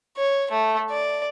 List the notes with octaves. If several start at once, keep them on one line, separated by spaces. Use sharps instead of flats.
C#5
A3
D5